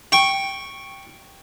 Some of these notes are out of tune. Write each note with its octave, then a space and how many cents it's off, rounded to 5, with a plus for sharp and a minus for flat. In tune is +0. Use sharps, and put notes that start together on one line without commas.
G5 +0 C#6 -5